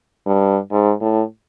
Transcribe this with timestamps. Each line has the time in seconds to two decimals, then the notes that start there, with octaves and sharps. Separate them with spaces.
0.26 G2
0.71 G#2
1.01 A2